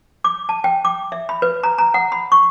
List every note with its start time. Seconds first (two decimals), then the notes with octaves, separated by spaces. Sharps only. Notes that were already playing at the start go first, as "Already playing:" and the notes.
0.24 D6
0.49 A5
0.64 G5
0.85 D6
1.12 E5
1.29 B5
1.42 B4
1.63 A#5
1.78 A#5
1.94 F#5
2.12 B5
2.32 C#6